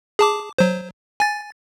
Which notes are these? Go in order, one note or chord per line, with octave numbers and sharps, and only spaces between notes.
G#4 A5 D6
F#3 C5
G#5 A6